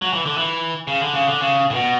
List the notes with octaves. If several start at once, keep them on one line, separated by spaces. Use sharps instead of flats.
F#3
E3
D3
E3
C#3
D3
C#3
D3
C#3
A2
B2